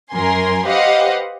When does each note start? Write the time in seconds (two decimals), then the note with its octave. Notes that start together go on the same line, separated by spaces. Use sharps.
0.12 F#2 A#4 G#5 C6
0.65 G4 B4 C5 D#5 F5 F#5